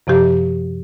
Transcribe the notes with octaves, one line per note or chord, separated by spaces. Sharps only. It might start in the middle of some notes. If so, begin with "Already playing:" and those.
F#2 C3 F3 G4